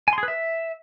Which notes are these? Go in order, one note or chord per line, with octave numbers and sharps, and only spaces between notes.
G#5
C6
G#4
B4
E5